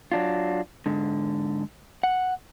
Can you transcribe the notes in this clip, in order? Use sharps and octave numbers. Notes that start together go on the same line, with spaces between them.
F#3 D4 F4
G#2 D3
F#5